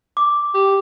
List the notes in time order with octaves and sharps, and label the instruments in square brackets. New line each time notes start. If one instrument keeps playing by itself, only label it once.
[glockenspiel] D6
[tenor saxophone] G4